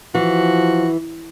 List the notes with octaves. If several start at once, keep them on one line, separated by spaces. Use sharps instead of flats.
E3 F3 F#4